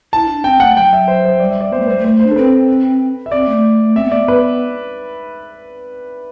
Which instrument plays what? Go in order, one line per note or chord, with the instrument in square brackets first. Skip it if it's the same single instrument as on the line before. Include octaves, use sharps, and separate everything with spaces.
[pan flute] E4 [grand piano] A5
[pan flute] D4
[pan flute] C4 [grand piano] G5
[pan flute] A3 [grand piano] F#5
[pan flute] F#3 [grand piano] G5
[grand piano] E5
C5
C5
[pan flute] G3 [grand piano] D5
[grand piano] E5
D5
[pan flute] B3 [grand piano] C5
[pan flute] A3 [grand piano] B4
[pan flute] G3 [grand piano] C5
[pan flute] A3
[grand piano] C5
C5
[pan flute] D4
[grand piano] A4
[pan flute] C4 [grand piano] B4
[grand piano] E5
[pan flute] C4 [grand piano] D5
[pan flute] A3
[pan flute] C4 [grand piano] E5
[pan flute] B3
[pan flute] A3 [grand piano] D5
[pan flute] B3
[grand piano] B4